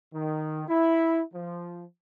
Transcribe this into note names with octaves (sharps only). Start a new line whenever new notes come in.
D#3
E4
F3